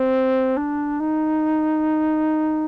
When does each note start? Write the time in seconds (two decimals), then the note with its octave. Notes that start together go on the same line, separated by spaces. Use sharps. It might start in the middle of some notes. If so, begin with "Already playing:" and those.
Already playing: C4
0.57 D4
1.00 D#4